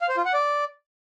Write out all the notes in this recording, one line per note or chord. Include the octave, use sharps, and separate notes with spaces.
F5
C5
F4
F#5
D5